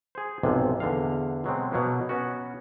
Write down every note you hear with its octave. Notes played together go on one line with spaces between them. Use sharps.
G#4 C5
B1 F2 G#2 C3
E2 D3 F5
B2 F#3 G#3 C4
B2 F#3 A#3 B3
B3 C#4 F#4